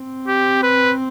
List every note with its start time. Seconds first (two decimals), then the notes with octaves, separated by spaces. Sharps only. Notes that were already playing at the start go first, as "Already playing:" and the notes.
Already playing: C4
0.28 G4
0.63 B4